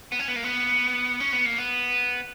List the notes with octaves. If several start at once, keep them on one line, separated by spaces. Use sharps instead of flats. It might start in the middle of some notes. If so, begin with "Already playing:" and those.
B3
C#4
B3
A#3
B3
C#4
B3
A#3
B3